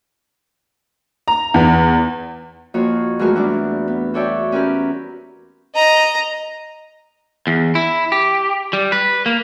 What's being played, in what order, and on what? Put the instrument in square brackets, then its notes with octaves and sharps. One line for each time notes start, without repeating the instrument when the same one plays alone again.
[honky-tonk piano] A#5
E2
[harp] F2 A#3 F#4 C#5
E2 G#3 A3 F#4 A#4
G3 D4 E4 F#4
B3
F#4 A4 C#5 D5 E5 G5
C4 C#4 F#4 G4 A#4 B4
[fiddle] D#5 A#5
[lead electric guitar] E2
E4
G4
G3
B4
A#3